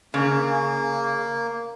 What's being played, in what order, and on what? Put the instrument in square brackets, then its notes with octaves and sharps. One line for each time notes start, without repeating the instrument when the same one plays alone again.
[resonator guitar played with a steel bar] C#3 [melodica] A#3